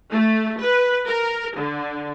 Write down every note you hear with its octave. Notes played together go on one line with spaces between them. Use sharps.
A3
B4
A#4
D3